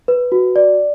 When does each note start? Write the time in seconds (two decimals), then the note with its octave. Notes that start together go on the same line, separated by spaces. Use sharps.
0.08 B4
0.32 F#4
0.56 D5